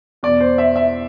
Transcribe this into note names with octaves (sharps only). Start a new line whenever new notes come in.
E2 B2 D5
C5
E5
E5